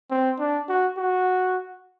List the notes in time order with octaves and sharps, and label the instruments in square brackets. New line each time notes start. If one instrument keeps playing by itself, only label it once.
[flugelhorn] C4
D4
F#4
F#4